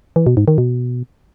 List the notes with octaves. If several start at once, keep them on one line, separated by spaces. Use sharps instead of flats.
E3
B2
G#2
D#3
B2